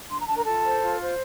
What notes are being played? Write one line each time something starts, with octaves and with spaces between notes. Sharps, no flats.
D4 C6
A#5
D4 A5
A#4 A#5
F4 A4 A5
C5
F4
C5